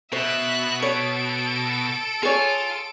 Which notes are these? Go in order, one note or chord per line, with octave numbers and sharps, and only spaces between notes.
B2 C5 E5 F#6
A4 C#5 D7
F4 G#4 C#5